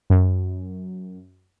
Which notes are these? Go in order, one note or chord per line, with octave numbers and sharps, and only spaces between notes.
F#2